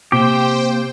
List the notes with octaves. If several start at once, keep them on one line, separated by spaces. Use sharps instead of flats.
C3 A#3 G4 C5 G5